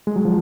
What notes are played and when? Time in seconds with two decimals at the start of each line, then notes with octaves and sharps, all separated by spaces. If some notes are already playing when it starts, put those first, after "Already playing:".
0.07 G#3
0.16 F#3
0.25 F3